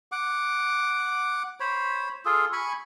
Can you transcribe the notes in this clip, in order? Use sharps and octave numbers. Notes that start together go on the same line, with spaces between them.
F#5 D6
C5 C#5 B5
F4 G#4 A4
G#5 B5 C#6